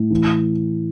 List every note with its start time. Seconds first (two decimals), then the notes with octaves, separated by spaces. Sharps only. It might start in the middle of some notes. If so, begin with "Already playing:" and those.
Already playing: A2
0.11 E3